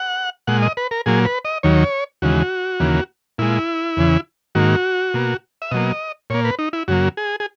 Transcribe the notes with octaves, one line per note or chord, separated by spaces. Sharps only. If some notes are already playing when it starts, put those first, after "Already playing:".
Already playing: F#5
A#2 G#3 F#5
D#5
B4
A#4
A#2 F#3 A#3 G#4
B4
D#5
D#2 D#3 F#3 C#5
D#2 C#3 E3 G#3 F#4
D#2 C#3 E3 A#3
A#2 G#3 E4
E2 C#3 E3
G#2 D#3 A#3 F#4
B2 A#3
E5
B2 F#3 A#3 D#5
A#2 A#3 C#5
B4
D#4
E4
F#2 C#3 F#3 A#3 F#4
G#4
G#4